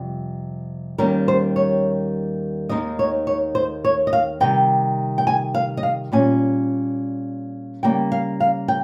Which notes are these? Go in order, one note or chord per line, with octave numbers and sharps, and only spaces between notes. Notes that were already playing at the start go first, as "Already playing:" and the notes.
Already playing: F2 C3 G3
D#2 D#3 G3 C#4 A#4
C5
C#5
D#2 D#3 G#3 D#4 D#5
C#5
C#5
C5
C#5
D#5
F5
C3 D#3 G3 G5
G5
G#5
F5
D#5
F5
A#2 G3 C#4 G#5
C#3 G3 A#3 G5
F5
F5
G5